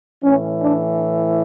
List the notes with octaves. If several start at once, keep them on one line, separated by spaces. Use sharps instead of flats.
A2 E3 C#4
D4